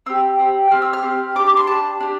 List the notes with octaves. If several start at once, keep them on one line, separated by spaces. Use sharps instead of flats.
C4 G4 E6
C4 G4
C4 G4 F6
E6
F6
C4 G4
D4 G4 D6
D6
C6
D4 G4 A5
D4 G4